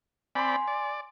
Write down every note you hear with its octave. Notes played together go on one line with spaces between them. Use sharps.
C4 D5 G#5 B5 C6
D5